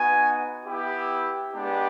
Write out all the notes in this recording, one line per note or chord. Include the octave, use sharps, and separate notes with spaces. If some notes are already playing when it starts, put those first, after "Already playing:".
Already playing: B3 D#4 F#4 G#5
B3 E4 G4
G#3 B3 D4 G4